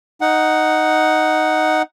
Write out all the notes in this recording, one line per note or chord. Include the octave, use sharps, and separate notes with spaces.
D#4 F#5